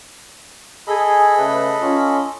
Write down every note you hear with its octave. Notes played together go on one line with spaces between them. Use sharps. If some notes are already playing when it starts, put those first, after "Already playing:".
G#4 A4 D#5 B5
C#3 A3 B4
C#4 F4